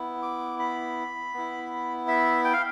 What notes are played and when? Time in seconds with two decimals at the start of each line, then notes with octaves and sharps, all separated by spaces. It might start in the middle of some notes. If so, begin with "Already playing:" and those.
Already playing: B3 E4
0.22 D6
0.59 B5
1.34 B3 E4
2.08 E5
2.45 G5
2.53 F5